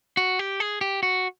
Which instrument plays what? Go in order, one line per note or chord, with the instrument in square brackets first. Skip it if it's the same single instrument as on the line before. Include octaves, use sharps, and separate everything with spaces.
[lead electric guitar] F#4
G4
G#4
G4
F#4